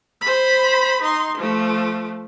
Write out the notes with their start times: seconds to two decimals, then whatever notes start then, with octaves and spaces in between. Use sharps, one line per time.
0.22 C5 B5
1.02 D#4 C6
1.37 F3 A3